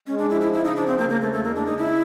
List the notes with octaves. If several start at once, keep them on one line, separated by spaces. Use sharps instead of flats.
G#3 C#4
D4
F3 E4
E4
C#3 E4
D#4
F3 D4
C4
C#3 A#3
A#3
E2 A3
A3
G#3 A#3
D4
C#3 D#4
E4